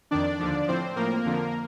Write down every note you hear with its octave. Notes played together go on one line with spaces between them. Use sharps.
F2 D#3 D4 D5
D#2 D3 F3
A2 F3 C4 C5
A2 F3 A#3 A#4
F2 D3 F3